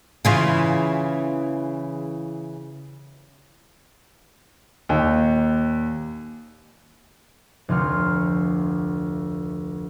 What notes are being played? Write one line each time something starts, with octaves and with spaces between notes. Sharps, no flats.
C#3 E3 F4
D#2 A#2
F1 D2 C6 F6